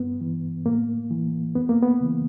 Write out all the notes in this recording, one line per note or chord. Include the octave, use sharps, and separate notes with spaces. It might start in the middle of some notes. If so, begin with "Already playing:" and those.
Already playing: G2 B3
E3
A2 A#3
E3
F2 B3
A#3
B3
C#3 E3